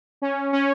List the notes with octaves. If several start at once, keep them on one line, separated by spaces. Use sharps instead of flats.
C#4
C#4